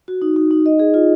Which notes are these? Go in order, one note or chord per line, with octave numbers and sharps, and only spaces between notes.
F#4
D#4
D#4
D#4
D#5
G#4
F4